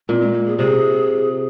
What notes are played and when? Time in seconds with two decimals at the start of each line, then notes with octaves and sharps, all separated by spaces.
0.09 A#2 C4
0.21 G#3
0.33 A#3
0.46 G#4
0.58 C3 G#4